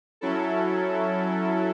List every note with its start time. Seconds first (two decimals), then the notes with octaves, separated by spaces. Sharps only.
0.21 F#3 C#4 E4 A4